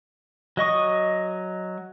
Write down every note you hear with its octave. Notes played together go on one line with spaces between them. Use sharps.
F#3 D#5 C#6 D#6